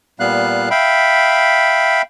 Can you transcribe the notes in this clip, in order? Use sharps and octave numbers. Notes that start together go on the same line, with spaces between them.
A#2 G3 B3 F5 F#6
E5 F5 G5 B5